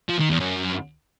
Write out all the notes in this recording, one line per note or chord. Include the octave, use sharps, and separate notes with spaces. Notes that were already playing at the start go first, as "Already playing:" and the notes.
F3
D#3
E2
F#2